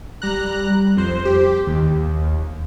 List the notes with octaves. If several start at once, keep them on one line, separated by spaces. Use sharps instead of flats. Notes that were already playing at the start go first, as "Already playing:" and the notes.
G3 A#5 F#6
F2 C5
G4
D#2